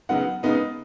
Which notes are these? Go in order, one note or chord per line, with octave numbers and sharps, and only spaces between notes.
C#3 F#3 B3 D#4 F#5
C#3 G#3 B3 D#4 D#5